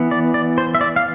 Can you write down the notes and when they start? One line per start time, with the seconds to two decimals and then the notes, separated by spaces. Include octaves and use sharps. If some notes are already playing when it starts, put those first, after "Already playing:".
Already playing: E3 B3
0.11 D5
0.34 D5
0.58 C5
0.75 E5
0.81 D5
0.96 F5